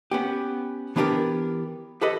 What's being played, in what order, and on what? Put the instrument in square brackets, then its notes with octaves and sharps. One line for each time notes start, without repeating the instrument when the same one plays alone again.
[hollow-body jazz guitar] B3 C#4 G4
E3 B3 D4 F4 G4 A#4
G4 A4 B4 D#5